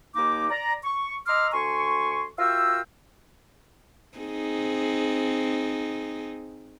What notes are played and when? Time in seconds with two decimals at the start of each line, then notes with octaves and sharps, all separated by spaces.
0.16 D#2 A#3 D#4 D6
0.50 D5 A#5
0.85 C#6
1.27 D#5 A#5 C6 D6 E6 F6
1.53 D2 G#5 C6 C#6
2.39 F4 F#4 A#4 E5 G5 E6
4.18 C4 D#4 G#4